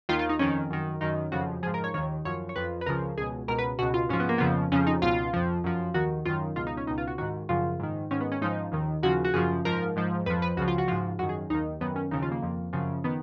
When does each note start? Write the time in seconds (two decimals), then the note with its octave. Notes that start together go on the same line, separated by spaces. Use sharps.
0.09 D#2 D#3 F4
0.19 F4
0.29 D#4
0.39 F2 D#3 C#4
0.70 F#2 D#3
1.01 F#2 D#3 D#4
1.32 F2 C#3 F3 F#4
1.63 F3 G#4
1.66 G#2
1.74 A#4
1.84 C#5
1.94 D#2 D#3 C#5
2.25 F#2 F3 C#5
2.49 C#5
2.56 F2 F3 B4
2.81 B4
2.86 C#2 C#3 F3 A#4
3.18 C#2 B2 G#4
3.48 C#2 B2 A#4
3.58 B4
3.79 C#2 B2 F#4
3.94 F4
4.09 G#2 F3 C#4
4.20 B3
4.29 A#3
4.38 F2 C#3 F3 B3
4.72 F2 C#3 F3 C#4
4.87 D#4
5.02 C#2 B2 F4
5.33 F2 F3
5.64 F#2 F3
5.94 D#2 D#3 F#4
6.26 F#2 D#3 F4
6.56 C#2 B2 F4
6.67 D#4
6.77 C#4
6.87 B2 D#4
6.90 C#2
6.98 F4
7.07 F#4
7.18 G#2 D#3 F#4
7.49 F#2 C#3 F3 F4
7.80 G#2 D#3
8.11 G#2 D#3 C#4
8.21 B3
8.32 C#4
8.41 G#2 F3 D#4
8.72 D#2 D#3
9.03 D#2 C#3 F3 F#4
9.25 F#4
9.34 F#2 C#3 F3 G#4
9.65 G#2 F3 A#4
9.96 G#2 F3
10.26 F2 F3 B4
10.42 B4
10.57 C#2 C#3 F3 F#4
10.68 F4
10.78 F#4
10.88 G#2 F3 F4
11.19 F#2 D#3 F#4
11.29 G#4
11.50 D#2 D#3 D#4
11.81 F#2 D#3 B3
11.96 C#4
12.11 D#2 C#3 F3 D#4
12.23 F4
12.32 A#3
12.43 F2 F3
12.73 F#2 C#3 F3
13.04 D#3 B3